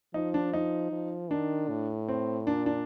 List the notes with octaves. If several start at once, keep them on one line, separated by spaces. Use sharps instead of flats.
F3 D#4
D4
D#4
F3
D#3 D4
A2
C4
A#2 D4
D4